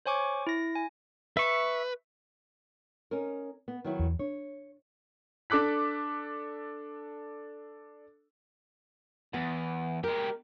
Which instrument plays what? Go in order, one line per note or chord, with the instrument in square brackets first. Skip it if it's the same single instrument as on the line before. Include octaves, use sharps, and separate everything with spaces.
[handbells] C5 C#5 G#5 C#6 D6
E4 A#6
G#5
[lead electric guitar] B4 [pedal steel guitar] E5 C#6
[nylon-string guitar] C#4 D#4 A#4
B3
D#3 F#3 E4
[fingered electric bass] E2
[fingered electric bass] D4 [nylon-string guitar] C#5
[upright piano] D4 A4 D6 F#6 B6
[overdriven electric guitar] E2 [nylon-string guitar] B3
[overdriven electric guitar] G#3 G4 [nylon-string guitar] A#4